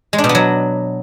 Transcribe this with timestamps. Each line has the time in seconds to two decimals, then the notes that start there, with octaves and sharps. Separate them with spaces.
0.13 G#3
0.18 D4
0.24 B2
0.29 B3
0.35 F#3